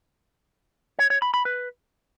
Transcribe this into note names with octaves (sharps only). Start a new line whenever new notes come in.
C#5
C#5
B5
B5
B4